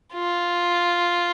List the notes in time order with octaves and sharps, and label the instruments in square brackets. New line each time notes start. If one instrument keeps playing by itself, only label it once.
[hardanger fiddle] F4